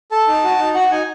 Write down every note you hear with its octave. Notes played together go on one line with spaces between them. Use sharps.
A4 A5
D#4
F#4
D#4
F#4 F#5
D#4 G#5